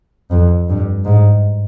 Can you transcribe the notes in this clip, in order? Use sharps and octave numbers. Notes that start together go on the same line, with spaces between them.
F2
G2
G#2